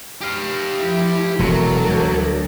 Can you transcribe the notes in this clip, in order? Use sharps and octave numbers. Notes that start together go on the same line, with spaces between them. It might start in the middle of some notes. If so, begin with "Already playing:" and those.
G4 F5
F3 E4
E1 E3 F#3 A4 A#4
D2